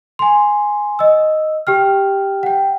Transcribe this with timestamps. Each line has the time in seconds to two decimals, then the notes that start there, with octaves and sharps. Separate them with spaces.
0.19 G#5 C6
0.99 D#5 E6
1.67 G4 G5 F6
2.43 F#5 G5